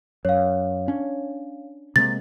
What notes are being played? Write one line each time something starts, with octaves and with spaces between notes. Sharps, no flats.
F#2 C#5 F5
C#4 D4
C3 G#3 A#3 A6